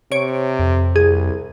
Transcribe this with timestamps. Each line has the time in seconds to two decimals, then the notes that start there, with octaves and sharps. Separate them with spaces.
0.12 C3 C#5 D7
0.59 F2
0.96 C2 G#4